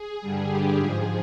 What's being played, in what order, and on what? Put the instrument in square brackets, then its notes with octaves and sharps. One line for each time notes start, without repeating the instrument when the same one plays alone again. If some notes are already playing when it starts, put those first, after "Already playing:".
Already playing: [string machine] G#4
G2 D3 G3
G4
G#2 F3 G#4